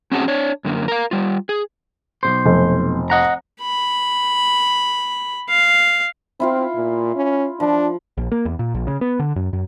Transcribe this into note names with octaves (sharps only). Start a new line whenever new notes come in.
C4 C#4 F#4 G#4 F#5 A5
D4 C#5
F#2 D3 A#3
A#4 F5
G3 F4
G#4
B1 B2 C5
F1
D#5 F#5 A#5
B5
F5
C4 E4 F4 F5
A#2
C#4
F3 D4
A#1
A#3
E2
A#2
A#1
C#3
B3
D3
F#2
F#2